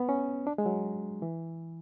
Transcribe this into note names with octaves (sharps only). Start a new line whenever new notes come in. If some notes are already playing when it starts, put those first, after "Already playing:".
Already playing: B3
C#4
D4
G#3
F#3
E3